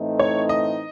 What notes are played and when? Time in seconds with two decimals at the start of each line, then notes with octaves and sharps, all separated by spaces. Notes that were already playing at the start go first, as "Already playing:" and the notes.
Already playing: A2 E3 A3 C4 D#4
0.19 C#5
0.49 D#5